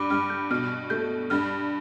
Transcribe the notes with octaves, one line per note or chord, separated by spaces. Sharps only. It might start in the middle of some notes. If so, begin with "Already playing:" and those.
Already playing: G2 B5 D6
G2 F6
G6
B2 F6
A3 G6
G2 F6